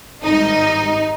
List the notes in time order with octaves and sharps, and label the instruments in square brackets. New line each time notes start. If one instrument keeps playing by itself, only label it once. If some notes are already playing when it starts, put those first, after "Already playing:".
[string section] G#1 G#2 G3 D#4